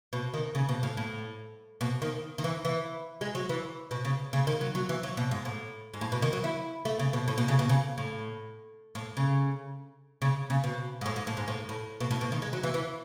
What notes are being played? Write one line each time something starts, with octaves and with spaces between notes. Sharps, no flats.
B2
D#3
C#3
B2
A2
A2
B2
D#3
D#3
E3
E3
G#3
F#3
E3
B2
C#3
C#3
D#3
F#3
F#3
E3
F#3
B2
G#2
A2
G#2
A2
B2
D#3
F#3
E4
A3
C#3
B2
A2
B2
C#3
B2
C#3
A2
A2
C#3
C#3
C#3
B2
G#2
A2
G#2
A2
G#2
A2
A2
B2
A2
B2
D#3
G#3
F#3
E3
E3